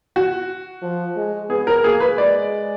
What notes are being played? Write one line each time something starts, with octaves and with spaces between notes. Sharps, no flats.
F#4
F3
G#3
B3 G#4
A#4
A#3 G#4
B4
G#3 D5